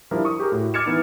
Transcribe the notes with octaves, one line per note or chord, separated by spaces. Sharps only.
F3 G3 D4 E4 A#4
C#6 D#6
G4 G#4 A#4
A2 F#4
D6 F6 G#6 A6 C#7 E7
E3 B3 D#4